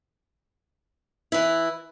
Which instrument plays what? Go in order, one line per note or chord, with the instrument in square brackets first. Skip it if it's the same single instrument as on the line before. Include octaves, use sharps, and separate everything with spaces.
[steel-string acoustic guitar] E3 E4